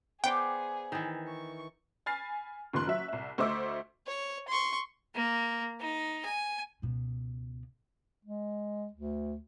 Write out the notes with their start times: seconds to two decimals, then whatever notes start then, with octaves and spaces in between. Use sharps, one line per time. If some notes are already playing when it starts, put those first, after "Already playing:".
0.24 B3 G#4 C5 D5 G5
0.92 D#3 E3
1.28 C#6
2.06 G#5 B5 F6 A6 C7
2.73 F#1 D#3 F3 C6 F#6
2.87 F#3 E5
3.08 C2 E5
3.38 D2 C5 D#5 E5 D6 E6
4.07 C#5
4.48 C6 C#6
5.15 A#3
5.80 D#4
6.25 G#5
6.82 C#2 B2
8.25 G#3
8.93 D2